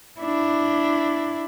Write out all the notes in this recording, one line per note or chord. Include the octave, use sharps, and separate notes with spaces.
D4 E4